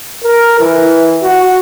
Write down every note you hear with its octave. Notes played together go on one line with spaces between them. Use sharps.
A#4
E3
F#4